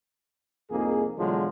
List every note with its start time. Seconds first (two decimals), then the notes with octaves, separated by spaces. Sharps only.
0.71 C2 F2 A#3 D#4 G#4
1.18 E2 B2 D3 F3 F#3 G#3